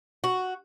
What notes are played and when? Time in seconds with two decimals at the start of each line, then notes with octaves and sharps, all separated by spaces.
0.24 F#4